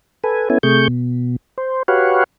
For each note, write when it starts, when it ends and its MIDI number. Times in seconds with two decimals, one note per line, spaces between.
0.24 0.49 69
0.24 0.49 71
0.24 0.49 80
0.50 0.58 59
0.50 0.58 61
0.50 0.58 64
0.50 0.58 69
0.50 0.58 80
0.63 0.88 48
0.63 0.88 57
0.63 0.88 68
0.63 0.88 85
0.63 0.88 91
0.88 1.36 47
1.58 1.83 72
1.88 2.24 66
1.88 2.24 67
1.88 2.24 71
1.88 2.24 73
1.88 2.24 77
1.88 2.24 78